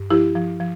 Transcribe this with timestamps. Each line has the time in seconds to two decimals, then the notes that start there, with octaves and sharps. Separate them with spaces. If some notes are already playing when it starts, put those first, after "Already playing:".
Already playing: G2
0.11 F3 E4 G4
0.35 F3
0.60 F3